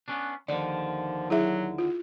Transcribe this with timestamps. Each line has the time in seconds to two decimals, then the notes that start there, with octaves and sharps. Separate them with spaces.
0.08 B3 C#4 D4
0.48 D#2 D3 D#3 F3 D5
1.30 F#3 E4 G#4 E5
1.78 F4